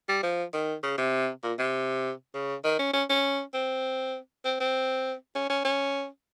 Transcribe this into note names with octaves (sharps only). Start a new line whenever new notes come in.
G3
F3
D#3
C#3
C3
A#2
C3
C#3
D#3
C#4
C#4
C#4
C4
C4
C4
C#4
C#4
C#4